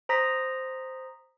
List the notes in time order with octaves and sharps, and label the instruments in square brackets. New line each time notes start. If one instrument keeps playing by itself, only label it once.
[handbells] C5 A#5 D#6 A#6 B6